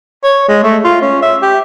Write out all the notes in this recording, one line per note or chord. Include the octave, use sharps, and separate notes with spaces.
C#5
G#3
A3
F4
C#4
E5
G4